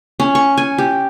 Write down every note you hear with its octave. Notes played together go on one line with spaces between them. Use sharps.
C#4
C#6
G#5
G4